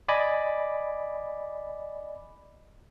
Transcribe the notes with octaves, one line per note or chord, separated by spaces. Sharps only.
D5 D#5 G#5 B5 D6